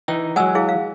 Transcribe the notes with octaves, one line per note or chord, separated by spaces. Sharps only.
E3 D#4 G5
F#3 G#3 F#5 G#5 E6
E4 G#4 F5
F5